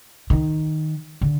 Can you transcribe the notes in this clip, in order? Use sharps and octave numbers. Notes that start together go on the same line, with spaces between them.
D#3
D3